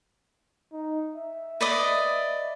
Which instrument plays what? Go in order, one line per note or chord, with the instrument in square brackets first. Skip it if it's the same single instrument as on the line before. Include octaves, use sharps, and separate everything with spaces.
[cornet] D#4
E5
[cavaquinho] B4 D5 D#5